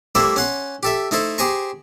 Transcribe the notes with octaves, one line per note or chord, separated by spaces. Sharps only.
G3 A3 A#3 E4 C5 E5
C#4 F#5 C6
G4 A4 E5
A3 D#4 E4 A4 C5
G4 G#4 C5 G#5 A#5 C#6